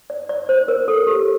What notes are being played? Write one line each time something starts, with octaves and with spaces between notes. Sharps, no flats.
D5
D5
C5
A#4
A4
G4